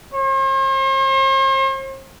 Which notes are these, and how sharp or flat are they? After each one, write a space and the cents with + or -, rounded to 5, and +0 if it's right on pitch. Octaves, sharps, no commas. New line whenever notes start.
C5 +45